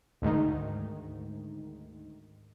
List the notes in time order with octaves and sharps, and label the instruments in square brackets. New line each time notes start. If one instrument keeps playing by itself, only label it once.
[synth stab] D2 G#2 D#3